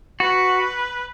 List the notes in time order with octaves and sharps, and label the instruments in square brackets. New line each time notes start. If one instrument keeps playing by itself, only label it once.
[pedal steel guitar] F#4 [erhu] B4